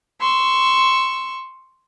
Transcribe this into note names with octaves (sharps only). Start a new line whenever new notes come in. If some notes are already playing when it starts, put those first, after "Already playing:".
C6 C#6 E6